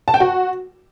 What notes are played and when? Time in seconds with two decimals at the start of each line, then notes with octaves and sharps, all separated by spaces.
0.08 A5
0.14 G5
0.20 F#4